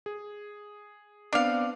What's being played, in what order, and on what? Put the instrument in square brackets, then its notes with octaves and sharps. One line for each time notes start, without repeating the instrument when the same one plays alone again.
[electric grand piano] G#4
[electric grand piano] B3 C4 D5 [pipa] D4 F5